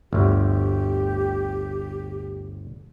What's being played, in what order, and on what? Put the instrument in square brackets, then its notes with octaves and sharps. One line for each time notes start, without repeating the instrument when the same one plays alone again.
[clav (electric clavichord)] G1 D2 [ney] G4